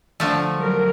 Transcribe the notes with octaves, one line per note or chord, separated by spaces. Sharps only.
D3 F3 A3
F#3 G3 A#4